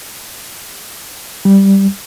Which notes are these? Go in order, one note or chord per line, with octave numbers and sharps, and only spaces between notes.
G3